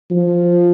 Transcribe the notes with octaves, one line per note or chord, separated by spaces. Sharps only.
F3